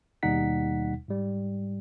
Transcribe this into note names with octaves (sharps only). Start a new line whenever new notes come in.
D#2 B2 G3 D#4 F#5 B6
G#2 G3